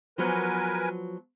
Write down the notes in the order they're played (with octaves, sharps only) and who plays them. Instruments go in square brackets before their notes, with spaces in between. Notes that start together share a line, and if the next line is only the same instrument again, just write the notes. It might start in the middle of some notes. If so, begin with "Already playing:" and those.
[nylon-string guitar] F3 F#3 B3 [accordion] A#4 B4 G#5